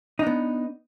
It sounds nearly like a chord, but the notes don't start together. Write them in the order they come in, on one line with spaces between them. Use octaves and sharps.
D#4 D4 B3